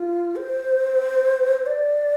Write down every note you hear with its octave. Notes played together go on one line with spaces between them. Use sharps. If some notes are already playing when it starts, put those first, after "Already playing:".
Already playing: F4
C5
D5